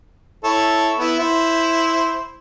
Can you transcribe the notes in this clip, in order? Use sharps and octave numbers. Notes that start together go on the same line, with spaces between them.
E4 A4 C#5
B3 E4
E4 C5